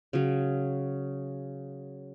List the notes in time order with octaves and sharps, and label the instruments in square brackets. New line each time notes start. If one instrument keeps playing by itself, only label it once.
[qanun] C#3 F#3